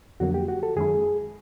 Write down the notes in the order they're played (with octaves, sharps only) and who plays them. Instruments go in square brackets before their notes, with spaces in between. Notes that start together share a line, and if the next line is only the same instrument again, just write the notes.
[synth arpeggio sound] F2 D3 F#3 A#3 [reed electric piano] F#4
[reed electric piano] G4
F#4
A4
[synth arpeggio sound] F#2 D#3 G#3 C#4 E4 [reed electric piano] G#4